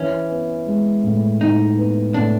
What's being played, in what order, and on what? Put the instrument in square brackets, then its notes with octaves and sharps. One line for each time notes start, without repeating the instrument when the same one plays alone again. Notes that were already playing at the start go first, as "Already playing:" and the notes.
Already playing: [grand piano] E3 [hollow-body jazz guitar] C#4
[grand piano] B3
G#3
A2
[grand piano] A2 [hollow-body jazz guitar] D#4
[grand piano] B3
[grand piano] A2 [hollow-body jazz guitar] D4